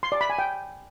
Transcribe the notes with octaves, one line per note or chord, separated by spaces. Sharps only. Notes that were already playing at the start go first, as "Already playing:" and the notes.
C6
D5
B5
G#5
G5